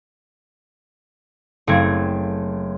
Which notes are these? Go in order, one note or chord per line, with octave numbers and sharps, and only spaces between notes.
F#1 A3 C4 G#6